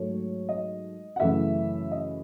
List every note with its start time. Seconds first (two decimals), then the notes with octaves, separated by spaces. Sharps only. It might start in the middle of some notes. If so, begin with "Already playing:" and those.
Already playing: G#2 F#3 A3 C#5
0.49 D#5
1.16 F#5
1.20 F#2 C#3 E3 A3 E5
1.92 D#5